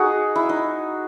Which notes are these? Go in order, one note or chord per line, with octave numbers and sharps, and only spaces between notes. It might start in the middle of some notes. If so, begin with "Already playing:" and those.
Already playing: D#4 F#4 G#4
E4
D#4